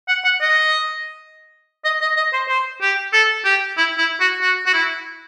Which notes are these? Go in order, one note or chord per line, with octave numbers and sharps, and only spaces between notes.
F#5
F#5
D#5
D#5
D#5
D#5
C5
C5
G4
A4
G4
E4
E4
F#4
F#4
F#4
E4